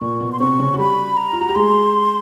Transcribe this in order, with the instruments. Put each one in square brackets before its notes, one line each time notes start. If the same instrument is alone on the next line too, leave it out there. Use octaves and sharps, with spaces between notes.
[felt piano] A#2 A#3 [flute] C#6
[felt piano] B2 B3
[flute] C6
[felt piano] C3 C4 [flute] C#6
[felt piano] C#3 C#4
F#4
[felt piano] G3 G4 [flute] B5
[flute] A#5
[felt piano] F4
F#4
G4
[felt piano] G#3 G#4 [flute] C6